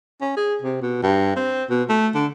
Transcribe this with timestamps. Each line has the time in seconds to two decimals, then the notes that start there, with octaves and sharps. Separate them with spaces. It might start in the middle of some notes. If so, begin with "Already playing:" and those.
0.21 C#4
0.37 G#4
0.62 C3
0.82 B2
1.03 G2
1.36 C4
1.70 B2
1.89 A3
2.15 D3